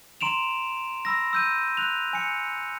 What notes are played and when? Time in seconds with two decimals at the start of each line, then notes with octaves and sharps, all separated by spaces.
0.21 A#5 C6 D7 E7 F7
1.05 B5 E6 A#6
1.33 E6 G6 D#7
1.77 F#6 F7
2.13 G#5 C#7